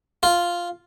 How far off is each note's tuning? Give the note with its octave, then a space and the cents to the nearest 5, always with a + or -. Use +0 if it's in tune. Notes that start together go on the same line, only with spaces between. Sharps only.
F4 +0